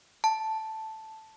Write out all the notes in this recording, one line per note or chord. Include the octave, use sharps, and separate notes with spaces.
A5